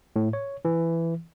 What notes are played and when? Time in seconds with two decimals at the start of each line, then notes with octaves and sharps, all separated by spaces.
0.16 A2
0.33 C#5
0.65 E3